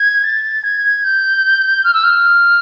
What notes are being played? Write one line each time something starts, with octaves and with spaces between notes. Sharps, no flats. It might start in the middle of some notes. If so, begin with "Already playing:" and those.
Already playing: G#6
A6
G#6
G6
F6
E6
F6